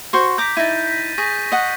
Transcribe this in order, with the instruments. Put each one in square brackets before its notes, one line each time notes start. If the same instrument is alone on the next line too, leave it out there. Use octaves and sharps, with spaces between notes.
[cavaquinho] F#4 C5 C#6
[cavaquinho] A#5 D6 [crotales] G6 B6
[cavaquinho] D#4 E4 [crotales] A6 A#6 D#7
[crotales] B6
[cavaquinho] G#4 [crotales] C#6 A#6 B6
[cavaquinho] D#5 F#5